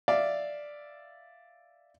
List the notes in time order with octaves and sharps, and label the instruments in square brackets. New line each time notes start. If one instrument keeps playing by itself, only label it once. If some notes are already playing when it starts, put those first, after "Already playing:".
[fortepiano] D5 E5 F5